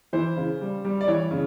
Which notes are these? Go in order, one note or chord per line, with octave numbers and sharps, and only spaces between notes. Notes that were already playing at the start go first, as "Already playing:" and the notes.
E3 C5
C#3
G3
G3
D5
E3 C#5
C#3